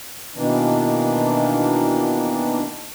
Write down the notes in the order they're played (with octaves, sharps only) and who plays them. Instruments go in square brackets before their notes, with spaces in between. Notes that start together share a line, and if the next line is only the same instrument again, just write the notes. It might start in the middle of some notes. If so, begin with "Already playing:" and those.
[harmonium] B2 D#3 E3 A#3 D4